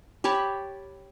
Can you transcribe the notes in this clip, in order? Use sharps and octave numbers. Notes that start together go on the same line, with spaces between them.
G4 C#5 A5 B5